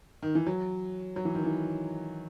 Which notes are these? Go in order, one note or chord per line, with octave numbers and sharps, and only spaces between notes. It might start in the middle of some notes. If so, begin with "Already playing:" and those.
D#3
E3
F#3
F#3
E3
D#3
E3